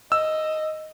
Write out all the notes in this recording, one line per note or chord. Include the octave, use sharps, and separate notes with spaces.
D#5 E6